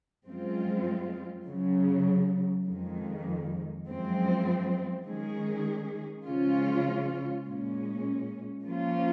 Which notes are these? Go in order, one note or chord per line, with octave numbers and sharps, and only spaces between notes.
F#2 F3 G#3 C4 F4
F#2 C#3 F#3
F2 D#3 G#3
F#2 F3 G#3 C4
D#3 G#3 C#4 G#4
C#3 F3 G#3 C#4 F4
A#2 G#3 C#4
F3 A#3 C#4 F4